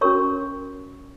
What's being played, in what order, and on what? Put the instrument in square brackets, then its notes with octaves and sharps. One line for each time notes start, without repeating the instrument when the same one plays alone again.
[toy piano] C#4 F#4 A#4 C#5 C#6